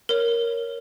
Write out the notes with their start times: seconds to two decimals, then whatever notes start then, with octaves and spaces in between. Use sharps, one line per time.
0.09 A#4 C#5